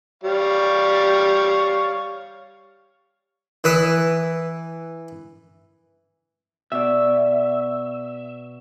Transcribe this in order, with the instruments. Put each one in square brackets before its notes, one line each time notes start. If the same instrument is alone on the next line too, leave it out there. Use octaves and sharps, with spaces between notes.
[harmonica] G3 C#5 F5
[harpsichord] E3 B4 D#6
[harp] B2 D5 [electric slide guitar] E5